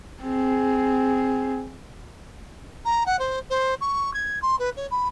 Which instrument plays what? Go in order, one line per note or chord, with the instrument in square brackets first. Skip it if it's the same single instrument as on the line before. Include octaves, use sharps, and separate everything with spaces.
[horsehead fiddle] C4 G#4
[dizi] A#5
F#5
C5
C5
C#6
G#6
C6
B4
C#5
B5